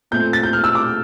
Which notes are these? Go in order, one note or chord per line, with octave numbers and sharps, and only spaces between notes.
A#2 A3 C4 G6
A6
G6
F6
E6
D6